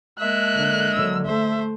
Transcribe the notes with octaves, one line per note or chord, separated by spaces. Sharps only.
G#3 A#3 E5 F#6
D3
D3 F#3 E6
A3 C5 E5